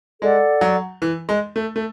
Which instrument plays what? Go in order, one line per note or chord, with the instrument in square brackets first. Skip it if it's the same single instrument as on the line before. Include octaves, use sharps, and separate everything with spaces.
[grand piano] G#3 [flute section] A4 D5 F#5
[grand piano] F#3
E3
G#3
A3
A3